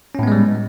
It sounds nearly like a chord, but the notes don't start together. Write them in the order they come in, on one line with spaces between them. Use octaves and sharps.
C#4 A2 B3 G#3 G3